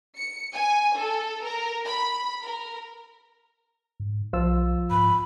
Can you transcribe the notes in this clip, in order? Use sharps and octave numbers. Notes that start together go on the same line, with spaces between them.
C#7
G#5
A4
A#4
B5
A#4
G#2
B1 F3 F4 E6
G#2 B5